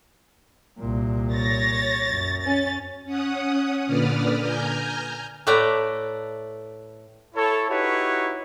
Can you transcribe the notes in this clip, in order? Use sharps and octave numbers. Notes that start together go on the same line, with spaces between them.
C2 A#2
C#5 A6 A#6
F#2
C#4 A6
C#4 F#5 D#6
A#2 D3 B4 D5 D#6 F6
G#5 A#5 F6 G6
A2 A3 B4 D5 A#5
E4 A4 C#5
D#4 E4 F#4 G4 B4 C#5